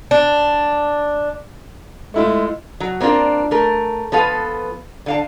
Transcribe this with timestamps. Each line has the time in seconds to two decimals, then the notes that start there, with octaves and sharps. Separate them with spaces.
0.11 D4
2.14 G#3 A3 E4 F4
2.80 F#3
3.00 A#3 C4 D4 F4 A#4
3.51 A3 A#4
4.12 F3 B3 A4 B4 F5
5.06 D3 F5 A5